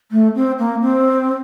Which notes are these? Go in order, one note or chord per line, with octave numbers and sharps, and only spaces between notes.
A3
C4
A#3
C4